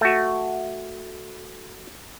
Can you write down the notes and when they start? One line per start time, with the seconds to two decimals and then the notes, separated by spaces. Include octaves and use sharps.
0.01 A3 F#4